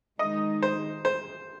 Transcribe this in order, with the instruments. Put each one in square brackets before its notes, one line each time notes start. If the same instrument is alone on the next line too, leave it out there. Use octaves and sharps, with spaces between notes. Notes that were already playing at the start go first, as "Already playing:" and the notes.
[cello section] D#3 G#3 D#4 [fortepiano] D#5
[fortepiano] C5
C5